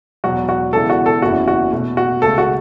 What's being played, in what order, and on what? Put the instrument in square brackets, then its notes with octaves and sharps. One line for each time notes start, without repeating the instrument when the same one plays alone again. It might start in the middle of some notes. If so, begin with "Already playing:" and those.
[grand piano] E1 E2 B2 F#3 [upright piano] F#4
[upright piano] F#4
[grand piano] E1 E2 C#3 E3 [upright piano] A4
[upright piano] F#4
A4
[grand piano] F#1 E2 E3 C#4 E4 [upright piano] F#4
[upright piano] F#4
[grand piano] B2 A3 F#4
[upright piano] F#4
[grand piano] C#2 C#3 A3 [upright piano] A4
[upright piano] F#4